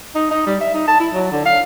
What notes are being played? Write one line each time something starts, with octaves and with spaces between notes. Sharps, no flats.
D#4
D#4
G3
E5
D#4
A5
E4
F#3
D3
F5